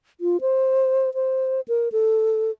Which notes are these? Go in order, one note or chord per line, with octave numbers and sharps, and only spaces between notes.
F4
C5
C5
A#4
A4